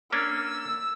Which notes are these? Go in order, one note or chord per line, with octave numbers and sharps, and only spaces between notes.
A#3 C#4 D4 E6